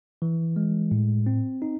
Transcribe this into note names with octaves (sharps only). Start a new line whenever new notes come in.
E3
G#3
A2
C4
D#4